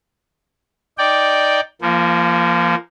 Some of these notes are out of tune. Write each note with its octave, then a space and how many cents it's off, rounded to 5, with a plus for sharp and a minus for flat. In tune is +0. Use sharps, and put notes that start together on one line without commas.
D#4 +0 D5 -5 G5 +0
F3 -30 A#3 +0